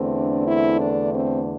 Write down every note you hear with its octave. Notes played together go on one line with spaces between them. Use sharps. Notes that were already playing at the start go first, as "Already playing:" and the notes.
Already playing: E2 D3 A3 C4
D4
E4
D4
C4